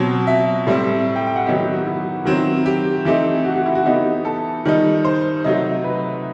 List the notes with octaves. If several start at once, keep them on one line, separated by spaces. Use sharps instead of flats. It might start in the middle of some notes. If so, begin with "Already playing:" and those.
Already playing: B2 F#3 C4
E5
A2 G3 C4
G5
G5
F#5
D#3 F#3 B3 D#4 G4
G4
F#4
E4
D#3 F#3 C4
G4
E3 A3 C4 D#4 G4
F#4
F#4
E4
F#4
E3 B3 D#4 G4
A4
D#3 G3 D#4
C5
C3 F#3 A3 D#4 D#5
B4